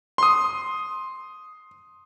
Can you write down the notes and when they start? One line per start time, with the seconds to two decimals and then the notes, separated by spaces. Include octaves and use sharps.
0.18 C6 D#6